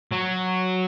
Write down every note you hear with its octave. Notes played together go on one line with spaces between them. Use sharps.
F#3